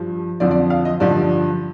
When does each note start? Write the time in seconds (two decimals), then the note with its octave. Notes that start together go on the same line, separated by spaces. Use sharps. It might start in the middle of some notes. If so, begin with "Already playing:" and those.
Already playing: G2 F3
0.40 F2 D3 F3 D5
0.51 D5
0.70 F5
0.85 D#5
1.00 G2 D3 F3 D5